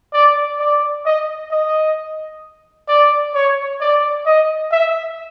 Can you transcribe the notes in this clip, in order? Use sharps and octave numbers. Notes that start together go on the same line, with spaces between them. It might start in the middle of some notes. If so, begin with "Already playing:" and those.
D5
D5
D#5
D#5
D5
C#5
D5
D#5
E5